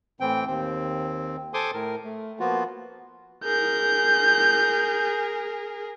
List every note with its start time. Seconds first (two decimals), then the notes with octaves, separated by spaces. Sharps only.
0.20 A2 E3 C4 G5
0.47 D#2 C4
1.54 A4 C5 G#5 C6 D6 D#6
1.74 A2 A#4
2.05 A3
2.40 F3 A#3 B3 F4 F#4
3.44 G#4 A#4 G6